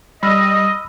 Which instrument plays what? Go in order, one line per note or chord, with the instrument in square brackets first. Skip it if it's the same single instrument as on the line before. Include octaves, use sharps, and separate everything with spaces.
[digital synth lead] G3 [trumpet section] D#5 [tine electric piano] B5 E6 F6